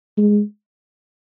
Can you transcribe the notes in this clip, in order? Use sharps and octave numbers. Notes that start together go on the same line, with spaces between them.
G#3